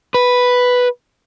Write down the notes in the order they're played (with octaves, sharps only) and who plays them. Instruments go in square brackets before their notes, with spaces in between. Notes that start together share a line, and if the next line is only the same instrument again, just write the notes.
[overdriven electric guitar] B4